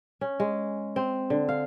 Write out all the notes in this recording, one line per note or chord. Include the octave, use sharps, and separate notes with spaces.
C#4
G#3
C4
D3
F5